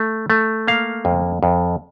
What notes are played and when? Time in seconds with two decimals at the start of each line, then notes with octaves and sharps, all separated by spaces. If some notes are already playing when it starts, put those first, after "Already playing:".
Already playing: A3
0.30 A3
0.68 A#3 F5
1.05 F2
1.43 F2